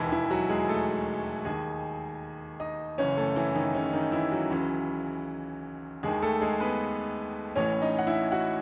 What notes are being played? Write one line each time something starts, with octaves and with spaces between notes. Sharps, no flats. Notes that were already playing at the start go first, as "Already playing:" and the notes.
Already playing: E1 D#2 D#3 E3 E4
E3 E4
F#3 F#4
G#3 G#4
A3 A4
D#2 D#3 G#4 G#5
D#4 D#5
F#1 F#2 E3 C#4 C#5
A3 A4
E3 E4
D#3 D#4
C#3 C#4
D#3 D#4
E3 E4
F#3 F#4
C#2 C#3 E3
D#2 D#3 G#3 G#4
A3 A4
G#3 G#4
B3 B4
A1 A2 E3 C#4 C#5
D#4 D#5
F#5
E4 E5
F#4 F#5